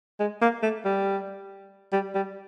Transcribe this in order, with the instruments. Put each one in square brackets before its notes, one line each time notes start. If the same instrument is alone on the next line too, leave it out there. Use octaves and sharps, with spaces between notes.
[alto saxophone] G#3
A#3
A3
G3
G3
G3